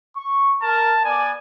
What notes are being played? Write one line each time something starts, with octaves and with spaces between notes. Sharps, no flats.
C#6
A#4 A5
B3 D5 G#5